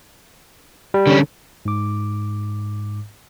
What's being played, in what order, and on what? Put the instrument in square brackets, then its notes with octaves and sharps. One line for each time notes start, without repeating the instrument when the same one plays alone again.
[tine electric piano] G3
[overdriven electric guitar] D3 C#4
[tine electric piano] G#2 D6